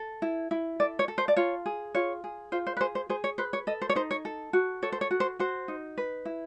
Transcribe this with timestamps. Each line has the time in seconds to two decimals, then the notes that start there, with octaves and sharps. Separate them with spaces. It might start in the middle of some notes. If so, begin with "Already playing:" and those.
Already playing: A4
0.22 E4
0.51 E4
0.80 A4 D5
0.99 C#5
1.08 A4
1.18 C5
1.28 D5
1.36 F4 C#5
1.66 G#4
1.95 F4 C#5
2.24 G#4
2.52 F4 C5
2.67 C5
2.77 B4
2.80 G#4 C5
2.95 C5
3.09 G#4 C5
3.24 C#5
3.38 B4 C5
3.53 C#5
3.67 A4 D#5
3.82 C5
3.89 C#5
3.95 D#4 C5
4.11 C#5
4.25 A4
4.53 F#4
4.82 A4 C#5
4.92 C5
5.01 C#5
5.11 F#4
5.20 C5
5.39 F#4 C5
5.68 D#4
5.98 B4
6.25 E4